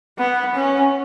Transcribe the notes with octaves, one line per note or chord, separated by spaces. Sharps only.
B3
C#4